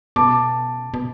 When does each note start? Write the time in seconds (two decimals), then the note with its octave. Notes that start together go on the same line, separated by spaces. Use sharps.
0.16 B2 A5 D6
0.94 B2